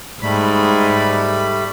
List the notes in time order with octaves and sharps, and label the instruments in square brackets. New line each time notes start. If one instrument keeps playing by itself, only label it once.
[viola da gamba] G#2 [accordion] G3 A3 B5